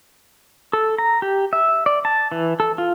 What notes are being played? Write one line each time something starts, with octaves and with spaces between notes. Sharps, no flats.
A4
A#5
G4
E5
D5
A5
E3
A4
F4